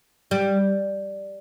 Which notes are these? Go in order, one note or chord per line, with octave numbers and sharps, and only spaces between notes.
G3